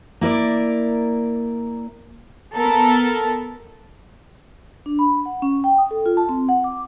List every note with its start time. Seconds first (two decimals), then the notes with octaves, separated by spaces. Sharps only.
0.21 A#3 E4 A#4 D5
2.54 B3 A4 A#4
4.86 D4
4.99 B5
5.26 F#5
5.42 C#4
5.64 G5
5.78 D#6
5.91 A4
6.06 F4
6.17 A5
6.29 C4
6.49 F#5
6.64 D6